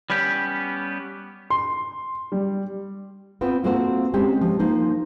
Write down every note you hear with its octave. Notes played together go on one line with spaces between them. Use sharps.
G3 B3 C#4 G4
C6
G3
B3 C4 F4
A#3 C4 F4 F#4 A4 C5
G#3 C4 C#4 G4 C5
F3
F3 A#3 D#4 C5